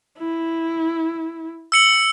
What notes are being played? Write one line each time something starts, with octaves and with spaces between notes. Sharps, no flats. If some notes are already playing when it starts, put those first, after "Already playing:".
E4
E6 C#7 F#7